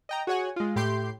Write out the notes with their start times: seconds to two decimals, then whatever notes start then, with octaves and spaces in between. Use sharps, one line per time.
0.09 D#5 G5 A#5
0.27 F#4 G#4 C#5 F#5 G#5
0.56 G#3 F4
0.76 A2 G4 C6 G6